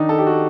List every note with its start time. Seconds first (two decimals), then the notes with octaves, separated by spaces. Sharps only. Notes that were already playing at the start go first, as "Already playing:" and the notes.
Already playing: D#3 D4 D#4
0.09 A4
0.18 G4
0.27 F#4